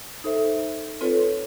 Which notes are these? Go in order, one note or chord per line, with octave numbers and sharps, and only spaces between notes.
D#4 A4 C5 E5
C4 F4 A4 B4 C#5